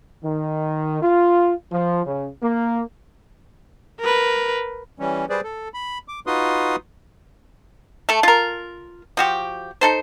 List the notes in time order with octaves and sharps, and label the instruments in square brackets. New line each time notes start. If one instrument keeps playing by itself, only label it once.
[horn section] D#3
F4
F3
C#3
A#3
[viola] A#4 B4
[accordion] E3 G3 C#4
G3 G#4 B4 C5 D5
A4
B5
D6
D#4 F4 F#4 B4 C6 D#6
[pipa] A3 A4
F4 A#4
F3 F#4 G4
D#4 A4 C5